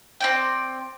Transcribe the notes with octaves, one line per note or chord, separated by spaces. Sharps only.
C4 D5 G5